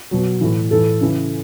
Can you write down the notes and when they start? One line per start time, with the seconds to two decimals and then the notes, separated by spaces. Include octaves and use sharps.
0.11 B2 F#3
0.41 A2 E3
0.71 A2 E3 A4
1.01 C#3 E3